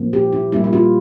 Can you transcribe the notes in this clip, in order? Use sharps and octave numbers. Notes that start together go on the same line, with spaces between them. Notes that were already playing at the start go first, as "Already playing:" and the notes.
Already playing: A#2 F3 A#3
G4
E4
A#2 G3 A#3 E4
E4
F4